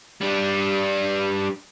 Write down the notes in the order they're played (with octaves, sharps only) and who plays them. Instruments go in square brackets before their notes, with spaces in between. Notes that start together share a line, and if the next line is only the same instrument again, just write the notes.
[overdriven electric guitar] G3 D4